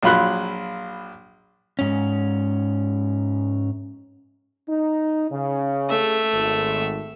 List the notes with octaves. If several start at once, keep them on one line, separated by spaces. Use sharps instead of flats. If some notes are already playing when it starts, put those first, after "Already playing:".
A#1 F#3 F4 B5 C6 F#6
G#2 C#4
D#4
C#3
A3 E5
G#1